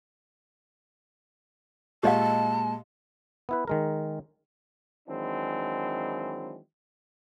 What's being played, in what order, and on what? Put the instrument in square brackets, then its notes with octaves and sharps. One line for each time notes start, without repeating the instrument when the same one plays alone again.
[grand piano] A#2 G#3 [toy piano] G4 D#5 F5 [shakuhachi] A5
[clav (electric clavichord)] B3 E4 B4
D#3 G#3 A#4
[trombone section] D#3 E3 F#3 G#3 C4 D4